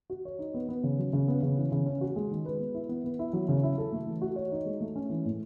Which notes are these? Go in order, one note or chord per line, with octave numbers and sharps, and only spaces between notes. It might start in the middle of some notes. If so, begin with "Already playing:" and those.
F#4
C#5
D#4
B3
B3
C#3
F#3
C#3
B3
C#3
E3
C#3
C#4
F#4
G#3
D#3
B4
B3
E4
B3
B3
E4
F#3
C#3
E4
A4
A3
E3
F#4
C#5
D#4
G#3
A3
C#4
E3
A2